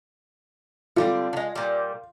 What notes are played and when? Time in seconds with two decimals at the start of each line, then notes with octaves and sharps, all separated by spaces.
0.96 D3 G3 C4 F4
1.33 D3 G#3
1.55 A#2 G3